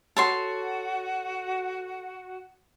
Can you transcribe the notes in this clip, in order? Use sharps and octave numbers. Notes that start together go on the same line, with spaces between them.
F#4 A4 C#5 C6